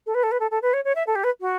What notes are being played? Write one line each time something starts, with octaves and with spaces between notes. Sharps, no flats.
A4
B4
A4
B4
A4
A4
B4
C#5
C#5
E5
A4
G4
B4
F#4